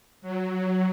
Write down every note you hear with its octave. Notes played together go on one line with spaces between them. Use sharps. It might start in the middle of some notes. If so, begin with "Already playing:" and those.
F#3